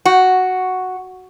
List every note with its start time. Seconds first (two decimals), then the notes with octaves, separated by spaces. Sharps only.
0.05 F#4